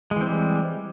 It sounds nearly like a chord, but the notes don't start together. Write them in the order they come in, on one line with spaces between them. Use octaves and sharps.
G#3 E3 C4 G3